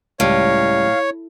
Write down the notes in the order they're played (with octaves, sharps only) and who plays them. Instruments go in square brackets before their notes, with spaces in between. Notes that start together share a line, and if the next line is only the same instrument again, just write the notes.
[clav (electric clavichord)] C#2 G3 [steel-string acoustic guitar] A2 [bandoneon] C#5 [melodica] F5